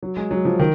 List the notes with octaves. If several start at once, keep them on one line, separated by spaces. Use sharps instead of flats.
F#3
G#3
F#3
F3
D#3